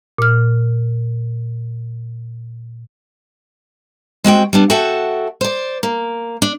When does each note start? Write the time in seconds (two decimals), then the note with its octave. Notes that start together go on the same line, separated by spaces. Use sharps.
0.18 A#2 F6
4.24 G#3 C4 F#4 G5
4.53 G3 B3 D4
4.70 F#4 A4 E5 F#5 G5 A5
5.41 C5 D5
5.83 A#3
6.42 D4